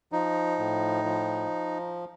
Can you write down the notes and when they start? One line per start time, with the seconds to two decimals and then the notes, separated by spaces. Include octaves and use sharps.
0.12 F3 D#4
0.58 A2
1.04 F3